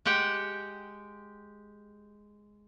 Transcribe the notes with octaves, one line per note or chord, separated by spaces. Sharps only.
G#3 G4 F#5 G5